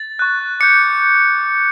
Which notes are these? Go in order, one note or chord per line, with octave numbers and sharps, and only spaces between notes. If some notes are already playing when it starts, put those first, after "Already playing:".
Already playing: A6
C#6 F#6
D6 G6 C#7